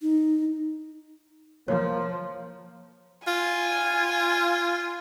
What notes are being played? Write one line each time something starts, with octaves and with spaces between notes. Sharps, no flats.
D#4
F3 A#3 C#5
F4 G#5